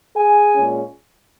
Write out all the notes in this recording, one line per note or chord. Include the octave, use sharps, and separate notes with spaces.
G#4 G#5
A#2 G#3 C#4